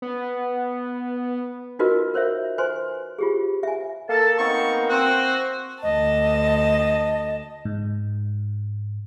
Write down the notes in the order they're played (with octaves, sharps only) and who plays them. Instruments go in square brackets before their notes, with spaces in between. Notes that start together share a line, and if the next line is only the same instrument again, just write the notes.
[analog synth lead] B3
[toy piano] D#4 F4 F#4 A#4 B4 D#5
A#4 C5 C#5 E5
B4 C5 G#5 C6
F4 G4 G#4
E5 G#5
[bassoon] A#3 [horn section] A4 [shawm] A5
[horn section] B3 C4 D#4 [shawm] C#6
[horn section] C4 [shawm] F#4
[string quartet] D2 A5 [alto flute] D#5
[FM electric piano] G#2